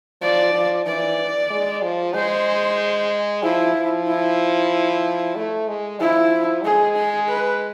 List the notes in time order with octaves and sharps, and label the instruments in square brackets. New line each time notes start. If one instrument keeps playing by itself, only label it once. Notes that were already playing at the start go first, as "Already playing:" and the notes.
[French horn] F3 [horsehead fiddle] D5
[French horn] F3
[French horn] E3 [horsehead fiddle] D5
[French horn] G#3
F3
[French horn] G#3 [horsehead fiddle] C5
[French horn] F3 [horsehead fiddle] E4
[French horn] F3
[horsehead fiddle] E4
[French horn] A3
G#3
[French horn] F3 [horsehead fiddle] E4
[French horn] G#3 [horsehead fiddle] G#4
[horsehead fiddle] G#4
B4